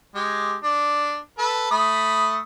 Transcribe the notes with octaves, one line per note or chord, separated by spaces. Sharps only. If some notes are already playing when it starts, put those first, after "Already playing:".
G#3 G4
D4
A4 B4 A5
A3 B5 D#6